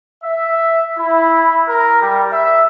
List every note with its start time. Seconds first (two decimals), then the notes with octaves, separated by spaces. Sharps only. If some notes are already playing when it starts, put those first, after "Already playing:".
0.22 E5
0.97 E4
1.68 A#4
2.01 G3
2.32 E5